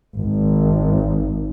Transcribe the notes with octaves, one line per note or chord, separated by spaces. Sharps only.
G#1